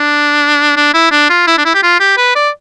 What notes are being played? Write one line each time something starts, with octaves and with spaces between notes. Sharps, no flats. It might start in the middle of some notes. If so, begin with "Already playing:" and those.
Already playing: D4
D4
E4
D4
F4
E4
D4
E4
G4
F4
G4
B4
D5